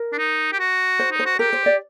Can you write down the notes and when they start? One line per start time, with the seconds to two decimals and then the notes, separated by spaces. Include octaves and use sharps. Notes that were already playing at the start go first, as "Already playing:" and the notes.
Already playing: A#4
0.13 D4
0.18 D#4
0.53 G4
0.60 F#4
0.99 C5
1.11 D#4
1.19 C5
1.26 F#4
1.39 G4 A#4
1.53 C5
1.66 D5